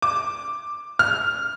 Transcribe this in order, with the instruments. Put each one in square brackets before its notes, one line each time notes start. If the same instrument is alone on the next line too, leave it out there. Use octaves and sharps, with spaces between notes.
[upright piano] D6
F6